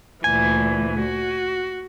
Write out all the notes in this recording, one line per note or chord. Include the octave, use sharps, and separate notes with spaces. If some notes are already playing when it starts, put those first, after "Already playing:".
D2 A#2 E3 G#5
F#4